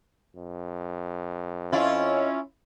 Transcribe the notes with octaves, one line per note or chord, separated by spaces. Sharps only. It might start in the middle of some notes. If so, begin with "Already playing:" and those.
F2
C#4 E4 F4 D#5